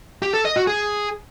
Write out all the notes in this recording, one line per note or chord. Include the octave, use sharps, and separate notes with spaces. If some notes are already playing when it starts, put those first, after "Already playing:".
G4
A4
D#5
F#4
G#4